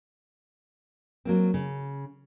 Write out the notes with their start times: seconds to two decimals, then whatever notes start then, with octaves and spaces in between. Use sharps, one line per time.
1.25 F#3 A#3 C4
1.54 C#3